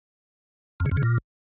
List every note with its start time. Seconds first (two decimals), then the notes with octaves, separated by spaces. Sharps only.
0.80 F2
0.86 C#3
0.91 F2
0.97 C#3
1.03 A#2